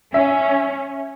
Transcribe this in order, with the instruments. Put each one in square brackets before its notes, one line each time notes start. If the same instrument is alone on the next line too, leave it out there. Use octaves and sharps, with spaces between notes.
[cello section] C#4 [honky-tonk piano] E5